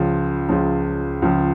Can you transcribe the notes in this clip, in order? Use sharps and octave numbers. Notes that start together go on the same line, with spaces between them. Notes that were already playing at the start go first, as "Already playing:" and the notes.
Already playing: C#2 C#3 F3
C#2 C#3 F3
C#2 C#3 F3